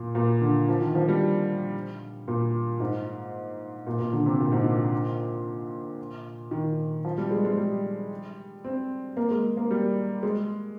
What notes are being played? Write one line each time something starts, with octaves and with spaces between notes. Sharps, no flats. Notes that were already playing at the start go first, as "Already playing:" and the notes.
Already playing: A#2
A#2
D3
F3
D#3
F3
G3
A#2
G#2
A#2
A#2
D3
C3
A#2
G#2
A#2
D#3
F3
G3
G#3
G#3
G3
C4
A#3
G#3
A#3
G3
G#3